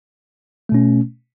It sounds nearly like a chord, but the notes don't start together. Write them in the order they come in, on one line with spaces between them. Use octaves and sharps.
A3 B2 C#4